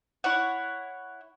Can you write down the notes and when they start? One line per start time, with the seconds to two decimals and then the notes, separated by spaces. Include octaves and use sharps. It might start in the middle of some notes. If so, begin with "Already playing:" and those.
0.24 E4 C#5 F#5